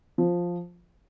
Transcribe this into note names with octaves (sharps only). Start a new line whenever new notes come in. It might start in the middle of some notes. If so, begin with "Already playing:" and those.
F3